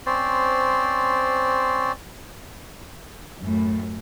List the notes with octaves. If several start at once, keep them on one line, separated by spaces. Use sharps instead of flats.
C4 C#4 C5 D5
F#2 A2